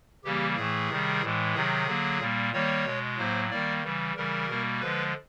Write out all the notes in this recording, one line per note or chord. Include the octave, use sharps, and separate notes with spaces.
C#3 E3 G3 A#3 G4
A2 E3 A3 G#4
C3 D#3 G3
A2 E3 G#3
C3 D#3 F#3 G#4
D3 F#3 A#3
A#2 G3 A#3
D#3 G3 A#3 C#5
B2 G#3
A2 F#3 A#3 C5
D#3 G3 A#3 D5
C#3 E3 G3
C#3 E3 G3 A#4
B2 G3 A#3
D3 F3 G#3 B4